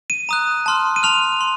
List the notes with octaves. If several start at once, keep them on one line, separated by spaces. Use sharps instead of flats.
D#7
A#5 D#6 F#6
A5 C6 F6
D#7
A5 C6 F6 F7
C6